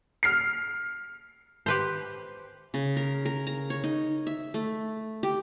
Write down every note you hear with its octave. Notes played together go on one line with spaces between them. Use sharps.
F6 C7
G4 B4 C5
C#3
A#4
A#4
A#5
C#5
D#4
E5
A3
G4